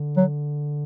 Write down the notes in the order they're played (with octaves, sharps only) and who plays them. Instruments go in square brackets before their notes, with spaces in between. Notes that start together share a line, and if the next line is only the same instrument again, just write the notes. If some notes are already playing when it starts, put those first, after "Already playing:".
Already playing: [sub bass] D3
[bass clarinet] F#3